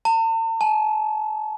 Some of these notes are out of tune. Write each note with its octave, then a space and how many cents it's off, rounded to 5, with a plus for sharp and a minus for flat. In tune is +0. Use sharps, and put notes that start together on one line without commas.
A5 +45
A5 -45